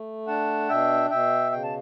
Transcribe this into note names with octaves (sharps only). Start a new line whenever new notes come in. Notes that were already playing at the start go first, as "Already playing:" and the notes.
Already playing: A3
D4 F#5 A5
B2 E5 G5
B2 E5 G5
C#3 G5
A5